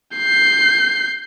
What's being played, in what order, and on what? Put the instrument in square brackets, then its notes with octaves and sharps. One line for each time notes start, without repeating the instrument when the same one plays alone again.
[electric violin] G6 C7